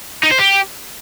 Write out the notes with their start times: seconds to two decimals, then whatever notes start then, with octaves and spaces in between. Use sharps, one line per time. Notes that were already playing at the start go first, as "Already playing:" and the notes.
0.23 D#4
0.31 C5
0.39 G4